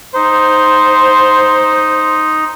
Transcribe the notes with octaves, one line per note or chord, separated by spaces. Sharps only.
D#4 C5